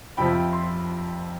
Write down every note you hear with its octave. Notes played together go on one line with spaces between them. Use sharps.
F2 C3 F3 G5 B5
C6